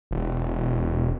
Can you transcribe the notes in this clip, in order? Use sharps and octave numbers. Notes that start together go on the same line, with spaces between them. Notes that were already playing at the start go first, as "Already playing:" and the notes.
E1